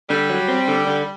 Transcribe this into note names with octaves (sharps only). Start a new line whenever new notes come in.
D3 G3
F#3
C4
D3
D3